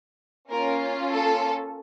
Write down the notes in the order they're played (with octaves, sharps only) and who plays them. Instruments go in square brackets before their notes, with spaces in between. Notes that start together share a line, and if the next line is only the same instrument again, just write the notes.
[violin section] A#3 C#4 F4 A#4
A4